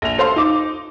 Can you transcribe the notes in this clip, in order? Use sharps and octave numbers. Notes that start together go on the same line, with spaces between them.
A#1 F7
A4 C5 F5 C6
D#4 D6